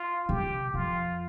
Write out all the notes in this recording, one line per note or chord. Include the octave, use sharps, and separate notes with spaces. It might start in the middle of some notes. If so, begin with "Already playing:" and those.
Already playing: F4
C3 G4
F2 F4